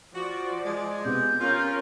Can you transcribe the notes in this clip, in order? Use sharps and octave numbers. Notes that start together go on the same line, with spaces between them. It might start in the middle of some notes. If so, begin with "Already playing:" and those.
F3 F#4 D5
G#3
C3 B3 G6
C#4 F4 A#4